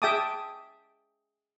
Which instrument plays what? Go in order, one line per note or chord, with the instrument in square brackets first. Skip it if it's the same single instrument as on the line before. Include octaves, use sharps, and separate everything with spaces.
[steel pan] G#4 E5 G5 A5 D6 D#6